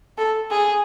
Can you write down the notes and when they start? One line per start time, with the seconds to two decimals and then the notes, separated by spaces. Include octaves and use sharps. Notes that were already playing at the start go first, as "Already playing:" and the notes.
0.18 A4
0.51 G#4